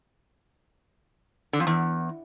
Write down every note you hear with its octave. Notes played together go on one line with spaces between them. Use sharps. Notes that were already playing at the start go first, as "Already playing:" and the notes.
D3
F2
E2